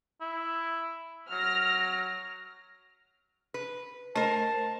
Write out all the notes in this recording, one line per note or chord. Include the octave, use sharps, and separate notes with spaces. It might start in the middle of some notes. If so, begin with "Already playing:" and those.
E4
F#3 F6 A#6
B4
A3 A#4 C5 D#5 A5